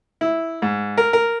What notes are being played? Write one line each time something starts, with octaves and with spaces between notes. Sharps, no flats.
E4
G#2
A#4
A#4